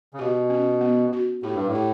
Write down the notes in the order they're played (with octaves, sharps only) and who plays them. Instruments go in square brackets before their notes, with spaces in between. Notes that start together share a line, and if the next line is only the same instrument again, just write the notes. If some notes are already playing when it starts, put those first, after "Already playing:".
[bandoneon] C#3
[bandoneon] B2 [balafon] G4
[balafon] C#4
B3
F#4
[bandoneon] A2 [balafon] G4
[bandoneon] G2
A2
[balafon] G4